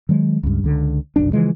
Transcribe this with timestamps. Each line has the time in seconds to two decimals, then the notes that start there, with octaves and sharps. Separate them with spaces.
0.09 D#3 F#3 G#3
0.43 C#2 G2
0.64 C#2 D3
1.16 F1 B1 F#2 D4
1.33 C#3 E3 F3 G#3